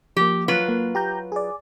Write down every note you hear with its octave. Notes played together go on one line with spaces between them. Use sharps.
F3 A#3 G4
F#3 F4 B4
A#3
G4 A#5 G6
G#4 D5